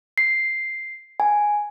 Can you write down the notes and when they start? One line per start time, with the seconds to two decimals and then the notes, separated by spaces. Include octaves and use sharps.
0.18 C7
1.20 G#5